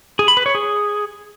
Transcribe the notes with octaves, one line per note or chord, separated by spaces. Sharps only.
G#4
B5
B4
C#5
G#4